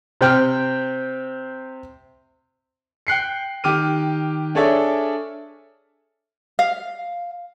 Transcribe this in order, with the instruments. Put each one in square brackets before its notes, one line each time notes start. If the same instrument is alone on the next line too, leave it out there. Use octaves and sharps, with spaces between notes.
[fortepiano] C3 C4 G5 F6
[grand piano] G5 F#6 C7 C#7
D#3 G4 D6 F6 D#7
D4 G#4 A4 C#5 D5 E5
[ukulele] F5